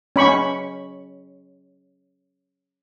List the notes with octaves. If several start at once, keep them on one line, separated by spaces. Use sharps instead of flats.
C#4 B5 C#6